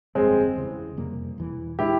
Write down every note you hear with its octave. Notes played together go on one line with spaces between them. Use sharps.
G1 F2 C#3 G3 G#3 C4
E2 C#3 E3
F2 C3 G3 A#3
E1 E2 E3
A#2 G#3 E4 G4